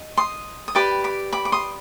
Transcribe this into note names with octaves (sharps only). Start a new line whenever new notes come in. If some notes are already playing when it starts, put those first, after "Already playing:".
Already playing: D#5
C6 D#6
D#6
G4 B4 D5 B5 D6
B5 D6
B5 D6
D6
C6 D#6